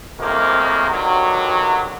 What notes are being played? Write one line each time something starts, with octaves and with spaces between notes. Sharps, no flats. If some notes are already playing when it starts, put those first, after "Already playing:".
F2 A2 C3 D#3 G#3 A#3
G2 D3 D#3 F#3